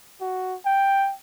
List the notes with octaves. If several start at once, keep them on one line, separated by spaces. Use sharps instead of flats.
F#4
G5